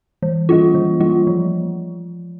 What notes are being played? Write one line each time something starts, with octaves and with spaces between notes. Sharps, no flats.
E3
G3 A#3 F4
E3
G3 A#3 F4
F3